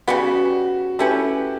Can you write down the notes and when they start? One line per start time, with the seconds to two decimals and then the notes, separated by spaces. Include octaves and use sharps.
0.08 C#3 G3 B3 F#4
0.99 A3 C#4 E4 G4 B4